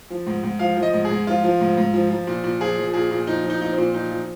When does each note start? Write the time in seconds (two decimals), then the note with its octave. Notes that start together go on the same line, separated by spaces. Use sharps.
0.10 F3
0.26 G#2
0.43 G#2
0.59 F3 F5
0.77 F3
0.83 D#5
0.93 G#2
1.05 G#4
1.10 G#2
1.27 F3 F4
1.44 F3
1.60 G#2
1.77 G#2
1.93 F3
2.10 F3
2.27 A#2
2.43 A#2
2.61 F3 G#4
2.77 F3
2.93 A#2 G#4
3.11 A#2
3.27 F3 D#4
3.44 F3
3.50 D#4
3.61 A#2 D#4
3.72 C4
3.78 A#2
3.94 F3 D#4
4.11 F3